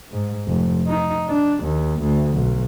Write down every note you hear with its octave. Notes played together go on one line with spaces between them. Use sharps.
G#2
F1
D#4
D4
D#2
D2
B1